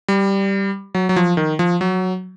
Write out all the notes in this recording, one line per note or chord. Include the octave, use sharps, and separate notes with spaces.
G3
F#3
F#3
F3
D#3
F3
F#3